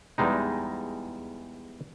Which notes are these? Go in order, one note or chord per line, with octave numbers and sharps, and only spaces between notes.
E2 G3 G#3 D#4